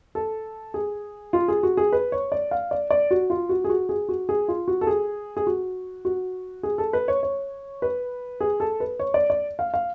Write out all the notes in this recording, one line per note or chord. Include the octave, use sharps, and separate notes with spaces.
A4
G#4
F4
G#4
F#4
G#4
B4
C#5
D5
F5
D5
D5
F#4
F4
F#4
G#4
F#4
G#4
F#4
G#4
F4
F#4
A4
G#4
G#4
F#4
F#4
G#4
A4
B4
C#5
C#5
B4
G#4
A4
B4
C#5
D5
D5
F5
F5